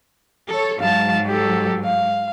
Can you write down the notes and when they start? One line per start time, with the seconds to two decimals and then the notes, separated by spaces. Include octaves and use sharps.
0.49 A4 C#5
0.80 G#2 F#3 F5 A5
1.26 G4 A4
1.85 F5